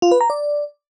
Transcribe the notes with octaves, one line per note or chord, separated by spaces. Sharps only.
F4
B4
A#5
D5